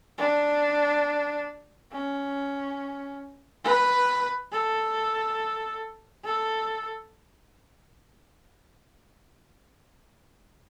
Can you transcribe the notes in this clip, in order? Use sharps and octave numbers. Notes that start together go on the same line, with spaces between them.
D4
C#4
B4
A4
A4